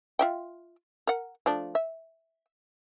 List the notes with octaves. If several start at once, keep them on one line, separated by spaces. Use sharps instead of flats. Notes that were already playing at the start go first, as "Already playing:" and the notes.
F4 E5 G5
A#4 F#5
F3 A3 D4
E5